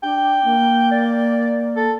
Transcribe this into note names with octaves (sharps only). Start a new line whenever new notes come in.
D4 G5
A#3
D5
A4